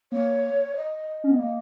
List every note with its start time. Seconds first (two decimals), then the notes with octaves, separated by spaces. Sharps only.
0.12 A#3 C#5
0.76 D#5
1.24 C#4
1.31 B3
1.39 A#3 D#5